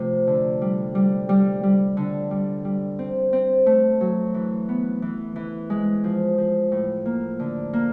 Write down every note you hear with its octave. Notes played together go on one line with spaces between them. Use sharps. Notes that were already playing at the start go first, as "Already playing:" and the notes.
Already playing: C3 F3 A3
D3
G3
G3
G3
G3
D3
G3
G3
C4
C4
A3
F#3
E3
B3
E3
E3
G#3
F3
F3
A2
A#3
D3
A#3